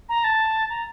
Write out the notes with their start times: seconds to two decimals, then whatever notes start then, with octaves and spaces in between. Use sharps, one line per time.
0.09 A#5
0.24 A5
0.70 A#5